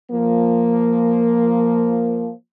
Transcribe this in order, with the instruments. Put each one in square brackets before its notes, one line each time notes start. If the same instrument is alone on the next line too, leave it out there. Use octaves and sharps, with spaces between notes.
[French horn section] F3 A#3